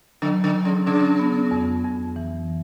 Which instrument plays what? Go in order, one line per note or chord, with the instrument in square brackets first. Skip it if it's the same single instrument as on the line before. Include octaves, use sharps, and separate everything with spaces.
[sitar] D3 [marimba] F#3
[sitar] D3
[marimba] F#3
[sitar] C#3
[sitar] C#3 [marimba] D4
[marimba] B3
F2
F2
E3